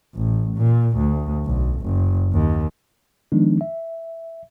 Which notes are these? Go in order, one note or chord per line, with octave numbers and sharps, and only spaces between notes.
A1
A#2
D2
B1
F#1
D#2
D#3 F3 G#3 B3 D4 D#4
E5